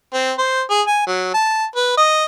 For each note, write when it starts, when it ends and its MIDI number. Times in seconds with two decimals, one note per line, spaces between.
0.13 0.32 60
0.38 0.62 72
0.70 0.82 68
0.87 1.02 80
1.07 1.32 54
1.34 1.65 81
1.76 1.96 71
1.97 2.25 75